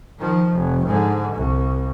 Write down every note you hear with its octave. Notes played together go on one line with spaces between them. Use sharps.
D#3 F3
F1
G#2 D3
C2